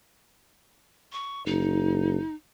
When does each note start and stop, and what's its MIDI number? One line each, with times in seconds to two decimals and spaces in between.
1.12 1.45 85
1.46 2.18 30
1.46 2.35 63